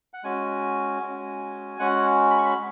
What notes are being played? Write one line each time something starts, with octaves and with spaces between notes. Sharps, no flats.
F#5
G#3 C#4 F#4 G#5
G#3 C#4 F#4
G#3 C#4 F#4 F#5
B5
C#6
B5
G#3